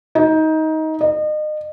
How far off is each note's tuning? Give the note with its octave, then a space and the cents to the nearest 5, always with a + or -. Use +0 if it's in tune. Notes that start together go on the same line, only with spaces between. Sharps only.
D#4 +20
D#5 -35